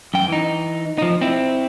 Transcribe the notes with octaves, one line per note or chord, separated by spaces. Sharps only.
F#2 G5
E3 D#4
F3 D#4
C4 E4